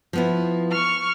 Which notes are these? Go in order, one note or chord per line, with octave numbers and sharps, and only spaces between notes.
F3 B3 E4
C#6 F6